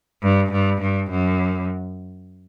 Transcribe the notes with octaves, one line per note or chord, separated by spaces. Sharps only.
G2
G2
G2
F#2